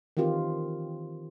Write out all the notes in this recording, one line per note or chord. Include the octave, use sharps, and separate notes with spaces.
D#3 E3 C4 F4 G4